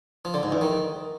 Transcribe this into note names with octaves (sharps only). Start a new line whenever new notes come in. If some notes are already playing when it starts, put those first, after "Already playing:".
F3
D3
G#2
E2
D#3